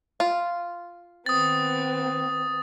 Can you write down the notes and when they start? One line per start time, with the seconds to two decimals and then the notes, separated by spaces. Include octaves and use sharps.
0.20 F4
1.26 D#3 B3 C4 D#6 A6